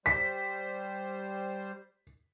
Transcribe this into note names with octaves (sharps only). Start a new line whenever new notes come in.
G3 C5 B6